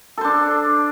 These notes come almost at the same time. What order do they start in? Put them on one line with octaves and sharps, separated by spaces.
A4 C5 D4